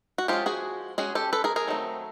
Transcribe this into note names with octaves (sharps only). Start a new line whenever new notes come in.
F#4
F3 G#3 C#4 F4 G4
F#4 G#4
G#3 C#4 F#4 G#4
G4 A4
A4 B4
G#4 A#4
G#4 A#4
D#3 F#3 A3 C4